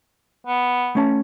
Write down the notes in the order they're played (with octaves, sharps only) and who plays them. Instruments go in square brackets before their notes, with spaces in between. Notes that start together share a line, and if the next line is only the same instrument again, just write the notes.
[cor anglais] B3
[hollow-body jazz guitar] A3 C#4 A5